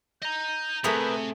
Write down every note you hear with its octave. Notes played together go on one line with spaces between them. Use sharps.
D#5 A#5 G6
C3 A3 B3 G#4 A#4 B4 E5